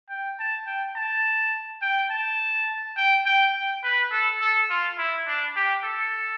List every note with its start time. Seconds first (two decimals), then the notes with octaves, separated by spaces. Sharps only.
0.09 G5
0.39 A5
0.67 G5
0.96 A5
1.82 G5
2.10 A5
2.97 G5
3.26 G5
3.54 G5
3.84 B4
4.12 A4
4.41 A4
4.70 F4
4.98 E4
5.27 D4
5.56 G4
5.84 A4